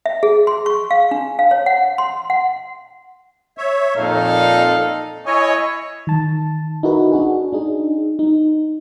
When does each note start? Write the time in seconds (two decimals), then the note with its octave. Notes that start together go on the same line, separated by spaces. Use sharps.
0.06 E5
0.23 G#4
0.47 C6
0.66 C#6
0.91 F5
1.11 D4
1.39 F5
1.51 C#5
1.66 F#5
1.98 C6
2.30 F#5
3.58 C#5 E5
3.96 F2 A#2 D#4 A4 F5
5.26 E4 C#5 D#5 G#5
6.07 D#3 A5
6.83 D#4 E4 F#4 A#4 B4
7.12 D4 F#4 G#4
7.52 D4 D#4 G#4
8.19 D#4